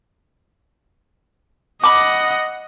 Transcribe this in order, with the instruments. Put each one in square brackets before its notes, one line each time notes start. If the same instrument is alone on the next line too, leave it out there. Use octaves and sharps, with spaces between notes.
[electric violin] D#5 F#5 [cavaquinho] B5 D6